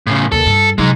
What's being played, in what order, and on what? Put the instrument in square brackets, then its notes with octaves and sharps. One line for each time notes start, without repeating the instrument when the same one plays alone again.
[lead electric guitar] A2 C#3
[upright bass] D#2 C#3 [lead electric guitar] A4
[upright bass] G2
[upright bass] C3 F#3 [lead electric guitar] G#3 D#4